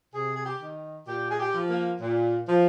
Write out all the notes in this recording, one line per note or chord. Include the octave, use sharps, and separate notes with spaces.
C3 G#4
G#4
G4
D#3
A#2 G4
G#4
G4
F3
A#3
A#2
F3